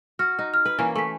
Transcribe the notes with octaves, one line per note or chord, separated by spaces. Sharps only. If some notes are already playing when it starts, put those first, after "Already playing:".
F#4 F6
D#4
F6
B4
E3 A#3 C#4
A3 C#6 B6